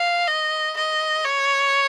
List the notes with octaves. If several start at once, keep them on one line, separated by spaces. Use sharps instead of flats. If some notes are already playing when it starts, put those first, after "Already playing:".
Already playing: F5
D#5
D#5
C#5